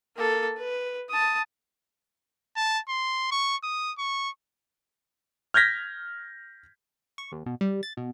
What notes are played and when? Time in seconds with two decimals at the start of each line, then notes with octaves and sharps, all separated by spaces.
0.17 A#3 A4
0.57 B4
1.10 A5 D#6
2.57 A5
2.89 C6
3.31 C#6
3.64 D#6
3.99 C#6
5.54 F6 G6 G#6 A#6 B6
7.18 C#6
7.32 D#2
7.46 B2
7.61 G3
7.83 A6
7.97 B2